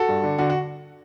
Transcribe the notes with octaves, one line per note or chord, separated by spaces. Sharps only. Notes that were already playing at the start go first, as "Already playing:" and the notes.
Already playing: F#4 A4
G2
D3
D3 F#4
F#4